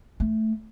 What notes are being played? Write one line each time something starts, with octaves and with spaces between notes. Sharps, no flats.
A3